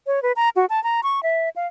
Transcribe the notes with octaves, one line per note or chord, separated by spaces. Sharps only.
C#5
B4
A#5
F#4
A5
A#5
C#6
E5
F5